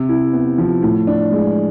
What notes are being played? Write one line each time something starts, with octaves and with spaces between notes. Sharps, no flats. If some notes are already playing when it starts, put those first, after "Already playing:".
Already playing: C3
E4
B3
F3
A2
D4
G#3